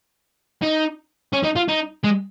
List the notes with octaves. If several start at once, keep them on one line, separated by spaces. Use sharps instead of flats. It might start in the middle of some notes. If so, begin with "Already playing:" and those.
D#4
C#4
D#4
F4
D#4
G#3